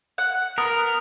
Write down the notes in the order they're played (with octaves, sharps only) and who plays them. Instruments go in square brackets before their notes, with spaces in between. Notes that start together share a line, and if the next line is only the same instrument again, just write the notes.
[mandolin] F#5
[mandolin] B3 [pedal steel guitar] A#4